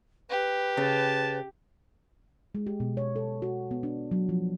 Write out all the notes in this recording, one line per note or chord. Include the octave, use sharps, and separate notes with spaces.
G4 B4
C#3 A5
G#3
G4
B2
C#5
A4
F#4
B3
D4
F#3
F3